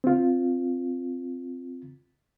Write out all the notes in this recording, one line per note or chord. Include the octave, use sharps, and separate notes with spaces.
C4 F4